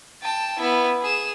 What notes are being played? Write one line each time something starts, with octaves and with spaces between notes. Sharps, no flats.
G5 A5
B3 E4
G#4 E7